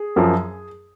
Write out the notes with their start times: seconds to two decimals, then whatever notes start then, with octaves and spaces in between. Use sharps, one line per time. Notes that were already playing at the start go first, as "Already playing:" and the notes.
Already playing: G#4
0.16 F#2 F3